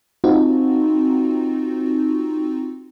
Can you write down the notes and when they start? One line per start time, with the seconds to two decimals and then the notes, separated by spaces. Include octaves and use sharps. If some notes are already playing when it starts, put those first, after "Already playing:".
0.24 C4 D#4 F4 F#4